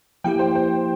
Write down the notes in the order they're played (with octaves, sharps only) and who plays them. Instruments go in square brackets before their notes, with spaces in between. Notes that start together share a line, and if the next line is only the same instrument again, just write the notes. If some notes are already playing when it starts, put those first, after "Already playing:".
[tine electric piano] F3 A#3 E4 G4 [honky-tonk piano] G5
[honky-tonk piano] C5
C5